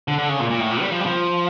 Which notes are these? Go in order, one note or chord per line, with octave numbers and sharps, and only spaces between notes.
D3
D3
C#3
A#2
A#2
A2
A#2
G3
F3
G3
F3